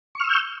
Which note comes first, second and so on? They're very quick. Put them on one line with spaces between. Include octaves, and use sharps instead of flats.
C#6 F6 E6 G6